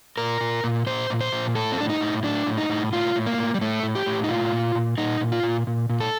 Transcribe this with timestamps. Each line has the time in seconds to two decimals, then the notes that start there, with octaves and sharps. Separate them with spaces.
0.17 A#2 A#4
0.41 A#2
0.64 A#2
0.86 A#2 C5
1.10 A#2
1.21 C5
1.32 A#2
1.55 A2 A4
1.72 C4
1.78 A2 D4
1.90 D#4
2.01 A2
2.23 A2 D4
2.47 A2
2.58 D#4
2.70 A2
2.93 A2 F4
3.16 A2
3.26 A#3
3.38 A2
3.54 G3
3.61 A2 A3
3.83 A2
3.95 G4
4.06 A2
4.24 D#4
4.29 A#2 F4
4.53 A#2
4.75 A#2
4.98 A#2 D#4
5.21 A#2
5.32 F4
5.43 A#2
5.67 A#2
5.89 A#2
6.00 A4